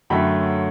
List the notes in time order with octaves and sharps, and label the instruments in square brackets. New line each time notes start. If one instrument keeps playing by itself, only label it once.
[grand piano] F#2 D3 F#3 A3 G5 B5